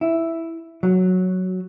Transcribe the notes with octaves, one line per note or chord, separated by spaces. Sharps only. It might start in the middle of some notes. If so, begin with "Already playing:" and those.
E4
F#3